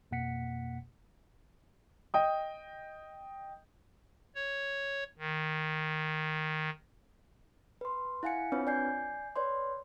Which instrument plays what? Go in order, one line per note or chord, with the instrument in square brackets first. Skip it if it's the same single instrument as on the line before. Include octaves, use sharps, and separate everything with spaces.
[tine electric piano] F2 B2 A#3 F#5 B6 C#7
[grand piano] D#5 G5 D#6
[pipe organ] C#5
D#3
[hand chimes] B4 C6
E4 F5 F#5 G#5 C#7
C4 D4 F4 B4 C#5
D5 G#5 G6 C7
B4 C#5 D5 C6